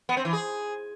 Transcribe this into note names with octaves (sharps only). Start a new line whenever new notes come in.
B3
C4
E3
G#4